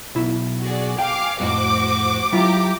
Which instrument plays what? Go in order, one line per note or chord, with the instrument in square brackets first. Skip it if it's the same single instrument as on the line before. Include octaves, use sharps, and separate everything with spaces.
[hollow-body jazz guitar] B1 E4
[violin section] F#4 G#4 D5
[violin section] F5 G#5 D6 [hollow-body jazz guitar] G5
[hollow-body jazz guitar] F2 A2 [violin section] F#4 C5 D6
[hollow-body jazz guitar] F#3 E4 F4 [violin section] G4 A#5 D6